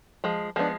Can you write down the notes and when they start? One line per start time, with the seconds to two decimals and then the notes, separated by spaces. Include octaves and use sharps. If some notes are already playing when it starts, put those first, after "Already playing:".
0.24 F3 G#3
0.56 F3 G#3 B3 D4